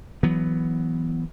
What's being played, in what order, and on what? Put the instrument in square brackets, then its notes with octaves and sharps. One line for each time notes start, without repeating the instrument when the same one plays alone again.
[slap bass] E3 F#3 B3